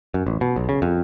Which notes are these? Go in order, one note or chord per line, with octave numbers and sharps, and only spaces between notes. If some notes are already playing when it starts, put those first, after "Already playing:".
F#2
A1
B2
B1
C#3
F2